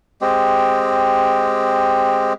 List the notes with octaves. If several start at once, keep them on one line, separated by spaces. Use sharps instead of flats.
G#3 C4 G4